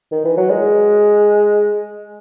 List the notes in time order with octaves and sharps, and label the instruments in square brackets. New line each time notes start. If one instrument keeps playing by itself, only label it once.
[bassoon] D#3
E3
F#3
G#3